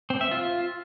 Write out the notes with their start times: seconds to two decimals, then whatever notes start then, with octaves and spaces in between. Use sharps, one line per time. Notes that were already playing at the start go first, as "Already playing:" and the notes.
0.10 C4
0.21 E5
0.31 F4